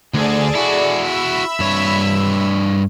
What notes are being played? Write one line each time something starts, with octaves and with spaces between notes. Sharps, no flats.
D2 G#4 A4 D5
E4 F#4
E5 B5 E6
G2 C#5